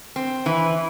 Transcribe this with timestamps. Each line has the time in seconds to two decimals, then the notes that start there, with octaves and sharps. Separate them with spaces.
0.16 C4
0.46 E3